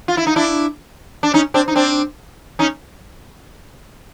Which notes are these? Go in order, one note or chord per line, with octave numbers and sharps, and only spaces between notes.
F4
E4
D#4
D4 E4
D4
C#4 D#4
C4 D4
D#4
C4 D4
C#4 D#4